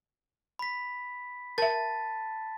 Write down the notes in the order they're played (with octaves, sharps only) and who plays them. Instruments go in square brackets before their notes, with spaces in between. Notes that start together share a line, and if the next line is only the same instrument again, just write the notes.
[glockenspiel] B5 B6
[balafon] A#4 E5 [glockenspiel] A5 A6